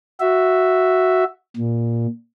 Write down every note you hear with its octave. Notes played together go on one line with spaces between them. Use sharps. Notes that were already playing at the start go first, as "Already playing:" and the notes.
F#4 E5
A#2